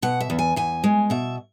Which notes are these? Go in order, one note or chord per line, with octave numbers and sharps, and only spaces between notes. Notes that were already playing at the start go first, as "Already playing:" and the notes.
B2 F#5
E5
E2
G#5
E2 G#5
G#3
B2 E5